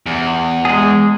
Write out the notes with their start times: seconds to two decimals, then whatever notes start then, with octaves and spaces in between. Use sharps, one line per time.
0.06 E2
0.65 G#3 G#4